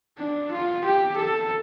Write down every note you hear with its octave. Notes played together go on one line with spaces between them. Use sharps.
D4
F4
G4
A4